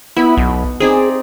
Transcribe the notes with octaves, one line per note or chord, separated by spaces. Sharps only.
B3 E4 B5
B1
C4 D#4 G#4 D5